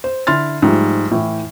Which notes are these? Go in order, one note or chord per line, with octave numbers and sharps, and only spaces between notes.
C5
D3 E4 C6 F6 A6
G#2 F3 G3 A3
A2 E3